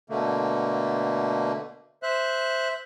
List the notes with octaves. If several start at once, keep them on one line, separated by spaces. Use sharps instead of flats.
B2 D3 A3 A#3
C5 E5 F#6